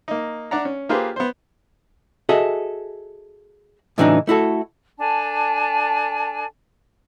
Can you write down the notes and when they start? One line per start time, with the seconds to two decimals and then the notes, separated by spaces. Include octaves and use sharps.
0.08 A#3 D#4
0.51 D4 D5 F#5 A#5
0.65 C#4
0.89 A#3 F4 G4 G#4 B4 C5
1.16 B3 C5
2.29 F#4 G#4 A4 D#5 E5
3.98 A2 C#3 E3 F#3 D4 D#4
4.27 A3 E4 F#4 A4
5.00 D4 A4 G#5 A5